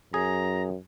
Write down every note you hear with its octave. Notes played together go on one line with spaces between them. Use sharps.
F#2 G#4 A#5